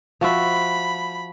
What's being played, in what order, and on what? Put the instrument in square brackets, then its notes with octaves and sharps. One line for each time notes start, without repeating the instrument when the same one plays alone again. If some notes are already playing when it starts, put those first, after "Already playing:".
[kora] F3 F#4 E5 [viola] B5